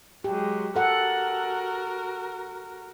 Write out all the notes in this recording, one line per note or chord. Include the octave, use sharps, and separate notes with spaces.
F#3 G#3 G4
F#4 A4 A#4 F#5